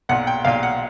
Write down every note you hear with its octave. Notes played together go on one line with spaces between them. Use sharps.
B1 A#2 F#5
G5
B1 A#2 F5
F#5